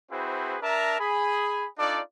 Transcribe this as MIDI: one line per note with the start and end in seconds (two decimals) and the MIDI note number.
0.11 0.57 60
0.11 0.57 64
0.11 0.57 66
0.11 0.57 68
0.11 0.57 71
0.11 0.57 72
0.62 0.97 62
0.62 0.97 70
0.62 0.97 76
0.62 0.97 81
0.62 0.97 82
1.00 1.66 68
1.00 1.66 83
1.78 1.99 62
1.78 1.99 63
1.78 1.99 65
1.78 1.99 69
1.78 1.99 74